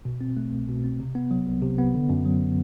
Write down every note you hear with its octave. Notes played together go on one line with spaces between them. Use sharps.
B2
C4
A3
C2
B2
C4
C3
B3
F#3
C2
C3
B3
D3
F#2
F#3